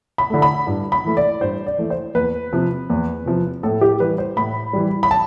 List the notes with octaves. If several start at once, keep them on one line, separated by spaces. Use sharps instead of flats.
B5
D3 A3
B5
G2
B5
E3 A3
D5
G2 C5
D5
E3 A3
C5
E2 B4
C3 F3
E2
C3 F3
A2 A4
G4
E3 G3 B4
C5
A2 B5
E3 G3
B5
A5